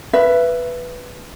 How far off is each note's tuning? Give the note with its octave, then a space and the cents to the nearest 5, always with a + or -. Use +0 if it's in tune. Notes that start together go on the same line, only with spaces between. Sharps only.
B4 +0 E5 +25